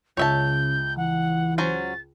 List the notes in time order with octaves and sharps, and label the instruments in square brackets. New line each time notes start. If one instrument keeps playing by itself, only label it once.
[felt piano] C#2 [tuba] C#3 [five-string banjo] C#5 E5 A5 [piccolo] G6
[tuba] E3 [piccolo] F#5
[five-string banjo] F#3 C#4 C5 [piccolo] A6